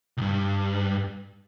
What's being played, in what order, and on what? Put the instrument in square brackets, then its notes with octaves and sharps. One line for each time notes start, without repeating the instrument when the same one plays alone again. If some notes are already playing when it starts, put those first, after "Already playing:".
[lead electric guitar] C2 G2